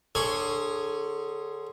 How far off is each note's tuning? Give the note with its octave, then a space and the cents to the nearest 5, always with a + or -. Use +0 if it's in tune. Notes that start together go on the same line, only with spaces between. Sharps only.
D3 +25 G#4 +0 C#5 +0